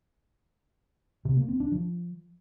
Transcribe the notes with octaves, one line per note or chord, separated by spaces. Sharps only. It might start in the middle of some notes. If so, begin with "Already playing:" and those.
C3
A#3
C4
D4
F3